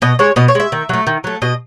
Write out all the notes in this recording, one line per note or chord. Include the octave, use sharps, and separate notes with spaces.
B2 D#5
G#3 C#5
B2 D#5
C#5
G#3 E5
D#3
F#3 A3
D#3
F#3 A3
B2 D#5